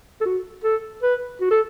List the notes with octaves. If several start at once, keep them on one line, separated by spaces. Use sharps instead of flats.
A4
F#4
A4
B4
F#4
A4